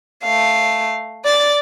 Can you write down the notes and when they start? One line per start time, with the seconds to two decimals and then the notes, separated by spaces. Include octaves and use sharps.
0.23 A3 F5
1.25 D5 A6